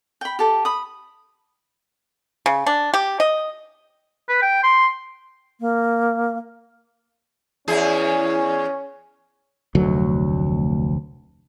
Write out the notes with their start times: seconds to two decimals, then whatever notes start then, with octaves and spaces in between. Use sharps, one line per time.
0.21 G5 B5
0.39 G4 A4
0.65 B5 D#6
2.46 C#3
2.66 D4
2.94 G4
3.20 D#5
4.29 B4
4.42 G5
4.63 C6
5.60 A#3
7.68 E2 C#4 G#4
9.75 F1 D2 F#3